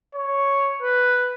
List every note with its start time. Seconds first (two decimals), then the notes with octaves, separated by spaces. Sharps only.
0.15 C#5
0.82 B4